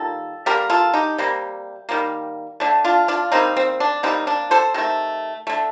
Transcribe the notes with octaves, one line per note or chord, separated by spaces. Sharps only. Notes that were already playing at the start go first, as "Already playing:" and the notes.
Already playing: D#3 G3 A#3 F4 A4
D3 G3 A#3 G4 A#4
F4 A4
D#4 G4
C3 G3 A#3
D#3 G3 A#3
D3 A3 D4
D4 F4
D4 F4
D#3 G3 A#3 C4 D#4
C4
D4
C3 G3 A#3 C4 D#4
D4
A4 C5
C3 D#3 A3
D3 A3